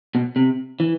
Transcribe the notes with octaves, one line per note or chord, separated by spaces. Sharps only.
B2
C3
E3